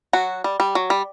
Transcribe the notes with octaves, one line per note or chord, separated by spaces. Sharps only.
F#3 F#4
G3
G3
F#3
G3